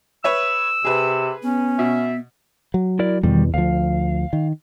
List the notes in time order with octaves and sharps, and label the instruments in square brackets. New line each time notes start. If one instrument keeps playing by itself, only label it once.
[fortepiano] B4 C#5 E5 [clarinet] E6
[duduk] C3 [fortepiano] G#4 B4
[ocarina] B3 [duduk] C#4
[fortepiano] B2 [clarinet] E5
[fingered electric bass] F#3
[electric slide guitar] E4 A#4 D5
[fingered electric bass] E2 B2 [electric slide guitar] D#3 G3
[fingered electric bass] D2 F3 [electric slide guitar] F5
[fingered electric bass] D#3